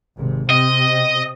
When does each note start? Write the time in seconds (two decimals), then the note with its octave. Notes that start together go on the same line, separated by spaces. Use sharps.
0.18 G#1 C3
0.49 C3 C4 D#5